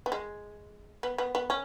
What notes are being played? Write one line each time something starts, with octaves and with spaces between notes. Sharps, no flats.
B3
G#3
B3
B3
B3
C#4